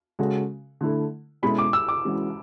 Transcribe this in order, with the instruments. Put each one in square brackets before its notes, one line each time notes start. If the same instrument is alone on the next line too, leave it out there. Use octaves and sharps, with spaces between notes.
[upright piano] C#3 G#3 C#4 F#4 A4
D3 A3 E4 A4
[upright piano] B2 G#3 C#4 E4 A4 [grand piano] B5
[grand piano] D6
E6
D6
[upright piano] E3 G#3 C#4 F#4